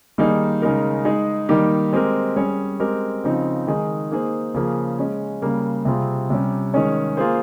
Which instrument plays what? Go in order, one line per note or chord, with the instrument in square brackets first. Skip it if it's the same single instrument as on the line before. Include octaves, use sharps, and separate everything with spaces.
[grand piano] D#3 G3 A#3 D#4 G#4
C#3 G#3 D#4 A#4
G#3 D#4 G#4
D#3 G3 A#3 D#4 G4
G#3 C4 G4 A#4
G3 C#4 G#4 C#5
G#3 C4 G4 A#4
C#3 F3 C4 D#4
D#3 G#3 D#4 G#4
A#3 D#4 G#4 C5
C#3 F3 A#3 C#4 G#4
G#3 C#4 G#4
C#3 G3 A#3
C3 G3 C4 F4 G#4
C3 G3 C#4
D#3 G#3 C#4 G#4 C#5
A#3 F4 G#4 C5